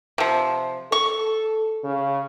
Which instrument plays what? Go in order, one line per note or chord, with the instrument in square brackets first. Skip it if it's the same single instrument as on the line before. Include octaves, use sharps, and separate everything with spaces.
[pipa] C3 F3
[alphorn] A4 [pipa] C#6
[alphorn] C#3